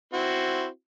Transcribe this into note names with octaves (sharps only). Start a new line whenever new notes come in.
C4 E4 F#4